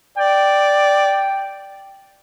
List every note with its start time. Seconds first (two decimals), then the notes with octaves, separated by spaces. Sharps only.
0.18 D5 G5